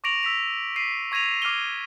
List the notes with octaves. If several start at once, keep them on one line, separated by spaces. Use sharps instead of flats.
C#6 D6 A#6 D7 F7 F#7
E6 B6 F7
B6 C7 D#7
C#6 G#6 A#6 D#7 F7
D6 F6 C7 D#7 G7